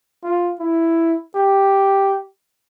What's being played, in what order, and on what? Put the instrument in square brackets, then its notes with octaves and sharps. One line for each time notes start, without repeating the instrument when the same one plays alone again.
[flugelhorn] F4
E4
G4